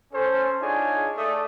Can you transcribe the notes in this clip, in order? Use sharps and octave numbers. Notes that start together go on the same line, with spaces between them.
C#4 A4 C5
D4 D#4 F4 G#4 C#5 G#5
A3 D5 D#6